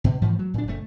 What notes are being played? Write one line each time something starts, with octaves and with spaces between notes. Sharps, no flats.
B2
G#2 E3 F3 A3
F#3
A#2 D4
F#1 A3